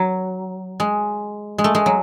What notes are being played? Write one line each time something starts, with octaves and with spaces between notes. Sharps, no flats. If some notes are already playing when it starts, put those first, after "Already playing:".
Already playing: F#3
G#3
G#3
A3
G#3
F#3